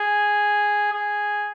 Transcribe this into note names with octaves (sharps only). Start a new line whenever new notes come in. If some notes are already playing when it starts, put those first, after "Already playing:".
Already playing: G#4
G#4